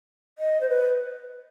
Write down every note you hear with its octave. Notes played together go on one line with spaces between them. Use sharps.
D#5
C5
B4